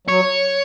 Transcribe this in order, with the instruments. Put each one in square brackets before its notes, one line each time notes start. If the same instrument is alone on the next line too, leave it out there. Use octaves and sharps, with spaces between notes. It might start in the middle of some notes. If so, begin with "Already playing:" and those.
[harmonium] F#3 [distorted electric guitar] C#5